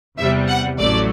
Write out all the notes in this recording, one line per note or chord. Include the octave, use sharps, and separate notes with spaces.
E2 C3 G3 E5
F#5
A1 A2 F#3 A3 D5